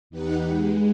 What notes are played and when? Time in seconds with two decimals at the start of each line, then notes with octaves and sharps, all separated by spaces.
0.10 E2 D#4 G4 B4 F#5
0.46 G#3